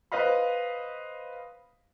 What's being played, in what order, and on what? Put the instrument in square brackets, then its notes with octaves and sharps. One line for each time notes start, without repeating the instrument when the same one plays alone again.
[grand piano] B4 C5 D#5 F5 B5